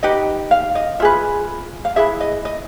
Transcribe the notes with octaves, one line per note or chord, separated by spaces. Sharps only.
D#4 G4 B4 D#5
F5
D#5
F4 G#4 B4 E5
F5
E4 G#4 B4 E5
D#5
D#5